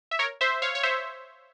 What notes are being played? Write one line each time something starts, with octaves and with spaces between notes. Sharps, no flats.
E5
A#4 C#5
C5 E5
C#5 F5
C#5
C5 E5